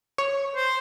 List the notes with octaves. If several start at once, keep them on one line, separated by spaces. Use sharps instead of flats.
C#5
C5